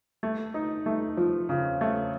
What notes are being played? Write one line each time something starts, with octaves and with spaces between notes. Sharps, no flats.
A3
D#4
A3
F3
C#3
A3